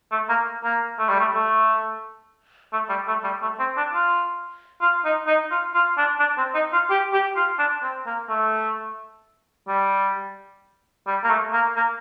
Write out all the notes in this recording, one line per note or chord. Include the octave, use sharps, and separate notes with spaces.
A3
A#3
A#3
A3
G3
A3
A3
A3
G3
A3
G3
A3
C4
D4
F4
F4
D#4
D#4
F4
F4
D4
D4
C4
D#4
F4
G4
G4
F4
D4
C4
A#3
A3
G3
G3
A#3
A3
A#3
A#3